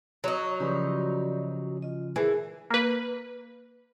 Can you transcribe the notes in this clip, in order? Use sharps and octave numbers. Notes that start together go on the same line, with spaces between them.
F#3 D#4
C#3 F3 G4 B4 D5
F4 D#5
E3 G#4 A#4 G#5
A#3 B4